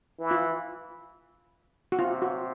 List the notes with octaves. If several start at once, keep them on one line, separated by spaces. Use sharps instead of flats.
E3
F4
F#4
C3 F4
F#4